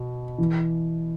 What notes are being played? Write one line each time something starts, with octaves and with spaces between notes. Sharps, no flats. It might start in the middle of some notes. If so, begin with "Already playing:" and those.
Already playing: B2
E3